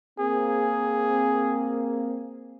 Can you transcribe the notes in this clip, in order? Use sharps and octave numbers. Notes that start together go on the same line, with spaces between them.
A#3 C4 G#4